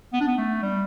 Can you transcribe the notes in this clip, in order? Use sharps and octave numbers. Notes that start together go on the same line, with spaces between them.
B3
D4
B3
A3
G3